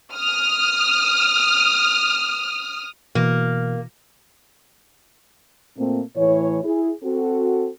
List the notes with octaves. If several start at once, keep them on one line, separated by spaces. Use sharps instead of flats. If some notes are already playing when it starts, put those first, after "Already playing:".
D#6 F6
B2 E3 A#3
A#2 A3 A#3 C4
A2 E3 A3 C#5
E4 G#4
C4 F#4 A4